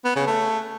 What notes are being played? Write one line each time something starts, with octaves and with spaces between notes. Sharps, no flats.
B3
C#3
A3